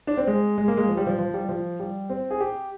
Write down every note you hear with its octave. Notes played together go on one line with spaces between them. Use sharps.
D4
C4
G#3
G#3
A#3
G#3
F3
G3
F3
F3
G3
F3
G3
C4
G#4
G4